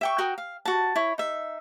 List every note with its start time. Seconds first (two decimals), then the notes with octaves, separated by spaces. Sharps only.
0.01 E5 G5 C#6
0.18 F#4 A#4 G5 D#6
0.38 F5
0.65 F#4 A5
0.96 E4 C#5
1.18 D#4 E5